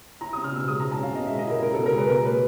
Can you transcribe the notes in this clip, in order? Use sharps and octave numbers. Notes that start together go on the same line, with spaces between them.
E4 A#5
D#6
C#4
F6
B2 E6
G#3 D#6
A#5
E4
A5
C#4 F5
B2 D#5
E5
G#3
D#5
E4 A#4
C#4 A#4
A4
B2
A#4
G#3 B4
B2 A#4
A#3 B4